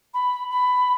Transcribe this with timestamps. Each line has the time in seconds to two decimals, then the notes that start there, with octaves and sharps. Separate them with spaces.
0.14 B5
0.51 B5